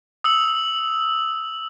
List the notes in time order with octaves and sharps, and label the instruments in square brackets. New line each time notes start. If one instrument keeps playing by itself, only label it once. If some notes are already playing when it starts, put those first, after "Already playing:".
[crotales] D#6 E6 F#7